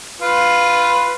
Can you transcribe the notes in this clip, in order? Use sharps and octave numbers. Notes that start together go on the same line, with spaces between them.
F4 B4